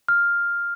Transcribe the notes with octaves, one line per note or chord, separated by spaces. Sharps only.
F6